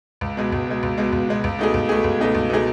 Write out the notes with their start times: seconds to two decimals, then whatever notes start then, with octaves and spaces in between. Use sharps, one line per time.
0.21 C#2
0.37 B2 G#3
0.52 C#2
0.67 B2 G#3
0.83 C#2
0.97 B2 G#3
1.13 C#2
1.28 B2 G#3
1.44 C#2
1.59 B2 A3 D#4 G#4
1.74 C#2
1.89 B2 A3 D#4 G#4
2.04 C#2
2.20 B2 A3 D#4 G#4
2.35 C#2
2.50 B2 A3 D#4 G#4